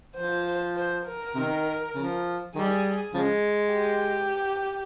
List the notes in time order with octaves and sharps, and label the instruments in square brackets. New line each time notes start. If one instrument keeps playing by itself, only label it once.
[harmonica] F3 [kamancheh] C5
[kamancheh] C5
A#4
[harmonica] C3 D#3
C#3 F3
[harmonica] D#3 G3 [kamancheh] G#4
[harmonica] C#3 F3 G#3
[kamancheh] G4